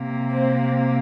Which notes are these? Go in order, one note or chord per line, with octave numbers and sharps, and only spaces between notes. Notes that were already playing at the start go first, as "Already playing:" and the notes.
Already playing: C3 A#3
C4